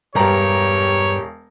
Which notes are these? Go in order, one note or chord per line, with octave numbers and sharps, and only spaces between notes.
E1 G2 G3 G4 C#5 A#5